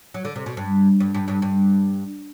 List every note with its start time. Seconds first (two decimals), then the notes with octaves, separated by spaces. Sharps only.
0.14 F#3
0.25 D3
0.36 C3
0.46 B2
0.57 G2
1.00 G2
1.14 G2
1.28 G2
1.42 G2